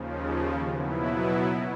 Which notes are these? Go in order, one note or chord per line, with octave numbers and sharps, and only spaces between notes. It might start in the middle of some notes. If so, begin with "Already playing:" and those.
Already playing: D#2 C#3 F3
B2 F#3 B3 E4